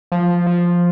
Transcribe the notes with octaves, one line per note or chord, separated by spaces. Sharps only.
F3
F3